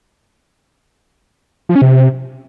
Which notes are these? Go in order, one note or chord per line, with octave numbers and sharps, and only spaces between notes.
F3
C#4
C3